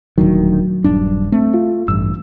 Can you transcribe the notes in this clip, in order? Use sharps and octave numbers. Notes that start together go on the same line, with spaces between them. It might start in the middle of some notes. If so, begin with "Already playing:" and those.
D#1 D2 D#3 F#3
D#1 G2 D4
A3 C4
F4
A1 G2 E6